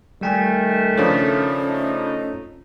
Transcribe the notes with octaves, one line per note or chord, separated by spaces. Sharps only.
D#3 G3 A3 G5 G#5
C#3 F3 C#4 D4 F4 A4 C#5
A3 D#4